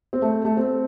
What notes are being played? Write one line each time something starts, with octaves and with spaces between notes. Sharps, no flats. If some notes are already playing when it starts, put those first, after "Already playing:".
C4
A3
A3
C4